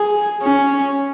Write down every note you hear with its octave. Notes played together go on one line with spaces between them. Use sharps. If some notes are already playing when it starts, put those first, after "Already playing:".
Already playing: G#4
C#4